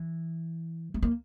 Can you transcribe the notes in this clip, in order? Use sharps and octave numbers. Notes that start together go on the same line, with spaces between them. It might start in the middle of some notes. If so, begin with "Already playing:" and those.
Already playing: E3
A3
A#3